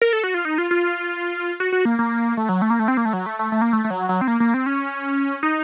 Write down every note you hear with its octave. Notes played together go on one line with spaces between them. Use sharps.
A#4
A4
F#4
F4
D#4
F4
F4
F#4
F#4
A#3
A#3
A3
F#3
A3
A#3
A3
C4
A#3
A3
F#3
A3
A3
A3
A#3
A3
A3
F#3
F#3
C4
A#3
A#3
C4
C#4
D#4